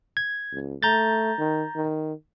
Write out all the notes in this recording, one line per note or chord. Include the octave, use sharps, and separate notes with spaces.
G#6
C#2
A3 A#5 G6 A6
D#3
D#3